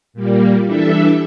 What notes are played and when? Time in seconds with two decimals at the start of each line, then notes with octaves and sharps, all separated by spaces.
0.13 A#2 G3 A#3
0.64 E3 G3 D4 A4 E5